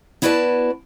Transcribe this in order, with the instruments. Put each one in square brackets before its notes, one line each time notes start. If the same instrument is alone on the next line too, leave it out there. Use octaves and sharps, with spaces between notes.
[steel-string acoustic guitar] B3 E4 F#4 B4 D5 A5